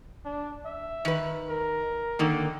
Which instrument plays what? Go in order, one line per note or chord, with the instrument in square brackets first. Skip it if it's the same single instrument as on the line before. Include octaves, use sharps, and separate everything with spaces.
[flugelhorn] D4
E5
[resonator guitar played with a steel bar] D#3 B4
[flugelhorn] A#4
[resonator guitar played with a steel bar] D3 D#3 A#3